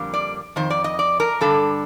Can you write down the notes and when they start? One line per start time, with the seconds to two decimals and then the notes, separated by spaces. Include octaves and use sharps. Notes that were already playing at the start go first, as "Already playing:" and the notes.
Already playing: F2 D3 G3 A#3
0.14 D5
0.56 F2 D#3 C5
0.70 D5
0.84 D#5
0.99 D5
1.20 A#4
1.41 G2 D3 G3 A4